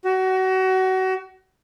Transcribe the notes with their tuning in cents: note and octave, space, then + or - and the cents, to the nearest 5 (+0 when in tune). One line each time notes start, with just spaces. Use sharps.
F#4 +25